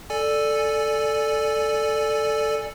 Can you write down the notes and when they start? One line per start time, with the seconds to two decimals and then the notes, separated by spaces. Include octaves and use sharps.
0.10 A4 D5 G#5